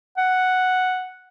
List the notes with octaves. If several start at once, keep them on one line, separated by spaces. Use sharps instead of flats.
F#5